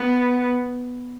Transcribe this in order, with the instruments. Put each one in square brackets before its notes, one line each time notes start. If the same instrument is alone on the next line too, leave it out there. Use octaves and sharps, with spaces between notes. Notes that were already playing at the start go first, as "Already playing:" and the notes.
Already playing: [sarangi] B3